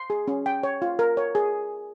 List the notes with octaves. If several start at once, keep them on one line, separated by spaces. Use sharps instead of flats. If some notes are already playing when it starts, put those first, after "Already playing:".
Already playing: C6
G#4
C#4
G5
C#5
F4
A#4
C#5
G#4